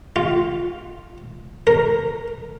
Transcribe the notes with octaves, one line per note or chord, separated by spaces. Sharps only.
F4
A#4